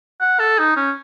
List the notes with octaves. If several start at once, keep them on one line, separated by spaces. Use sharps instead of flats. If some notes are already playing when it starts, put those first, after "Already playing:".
F#5
A4
D#4
C#4